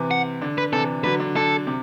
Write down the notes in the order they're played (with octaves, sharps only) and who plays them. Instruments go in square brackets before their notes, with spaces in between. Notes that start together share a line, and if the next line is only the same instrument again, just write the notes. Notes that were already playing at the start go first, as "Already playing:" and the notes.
Already playing: [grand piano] C3 E3
[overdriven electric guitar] F#5
[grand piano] D3
[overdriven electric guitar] B4
[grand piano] C3 E3 [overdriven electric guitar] A4
[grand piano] D3 F#3 [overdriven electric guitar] B4
[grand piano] D3
[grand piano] D3 [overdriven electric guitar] A4
[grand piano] C3